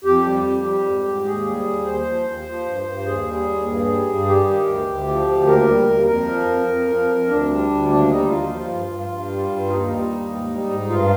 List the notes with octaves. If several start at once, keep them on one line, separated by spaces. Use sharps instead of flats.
F2 G4
G3
F2
G3
G#2
G#2
D#2 G#4
G3
D#2
D#2 C5
F3
D#2
F3
G2
G2
D#2 G#4
G3
D#2
G2
G3
G2
G3 G4
D#3
D2
D2
F3
D2
D#2 A#4
G3
D#2
F2 A#4
F3
F2
F2
F3
F2
D2 D4
G3
D2
D#2 D4
G3 D#4
D#2 F4
F3
G2
G2
G2
G3
G2
D#2 D#4
G3
D#2
G#2
G3
G#2
G2 F4